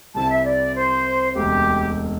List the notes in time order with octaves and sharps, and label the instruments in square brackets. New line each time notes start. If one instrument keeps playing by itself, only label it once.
[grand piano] C2 C3 G3 C4 E4 [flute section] A5
[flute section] E5
D5
C5
[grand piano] E1 D2 C3 [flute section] G4